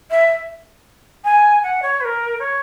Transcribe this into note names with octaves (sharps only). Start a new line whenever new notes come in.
E5
G#5
F#5
C#5
B4
A#4
C#5